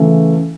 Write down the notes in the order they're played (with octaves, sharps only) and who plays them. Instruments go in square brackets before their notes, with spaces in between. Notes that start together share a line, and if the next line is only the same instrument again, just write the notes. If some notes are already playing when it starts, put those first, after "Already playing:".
Already playing: [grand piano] C#3 E3 A3